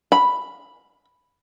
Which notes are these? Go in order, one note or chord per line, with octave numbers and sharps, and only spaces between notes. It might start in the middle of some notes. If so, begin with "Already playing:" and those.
B5